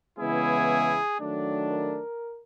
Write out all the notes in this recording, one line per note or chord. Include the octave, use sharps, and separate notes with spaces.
C#3 E3 G#3 B3 E4 G#4
D#3 F#3 A3 D4
A#4